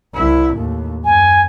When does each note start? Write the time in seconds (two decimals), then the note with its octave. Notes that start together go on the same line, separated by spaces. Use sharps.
0.15 C2 E4
0.54 D#2 A2
1.04 F#2 G#5